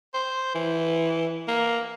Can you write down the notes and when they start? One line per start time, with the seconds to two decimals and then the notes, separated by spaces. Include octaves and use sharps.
0.14 C5
0.55 E3
1.48 A#3